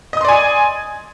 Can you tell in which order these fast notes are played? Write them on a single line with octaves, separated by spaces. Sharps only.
D#5 D#6 C6 D5 G#5